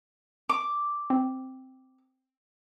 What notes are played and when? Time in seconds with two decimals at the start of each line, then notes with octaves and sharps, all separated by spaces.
0.49 D6
1.10 C4